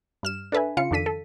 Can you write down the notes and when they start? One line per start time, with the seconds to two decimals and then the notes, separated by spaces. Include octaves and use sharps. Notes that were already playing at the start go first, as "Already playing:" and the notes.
0.23 G2 F6 E7
0.52 D4 A4 B4 E5 G#5
0.77 C#3 F4 F5 C#7
0.91 F2 D#3 D4 A4 B6 D#7
1.06 A4